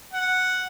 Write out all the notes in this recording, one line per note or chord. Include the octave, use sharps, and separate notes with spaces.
F#5